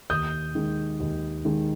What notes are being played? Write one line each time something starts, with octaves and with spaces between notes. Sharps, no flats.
D#2 D#6 G6
D#3 G#3
D#2
D#3 G#3